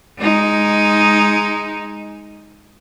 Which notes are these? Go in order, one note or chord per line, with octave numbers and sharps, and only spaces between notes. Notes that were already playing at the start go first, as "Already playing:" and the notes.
G#3 D#4